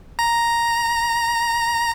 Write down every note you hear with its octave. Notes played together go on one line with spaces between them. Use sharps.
A#5